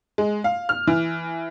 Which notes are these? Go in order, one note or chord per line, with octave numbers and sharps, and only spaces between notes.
G#3
F5
F6
E3